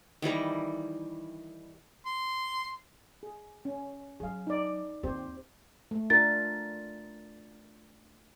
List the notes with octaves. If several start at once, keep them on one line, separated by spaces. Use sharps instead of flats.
D#3 E3 G3 A#5
C6
G#4
C#4
F#3 G#4 F5
D#4 D5
D#2 C4 G4 C5
A3
D4 F4 A#4 A6